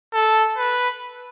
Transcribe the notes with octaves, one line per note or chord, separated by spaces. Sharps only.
A4
B4